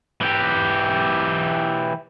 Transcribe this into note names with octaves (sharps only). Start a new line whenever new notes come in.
E3 G4